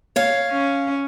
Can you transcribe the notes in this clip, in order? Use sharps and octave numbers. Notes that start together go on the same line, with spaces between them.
C#5 F5
C#4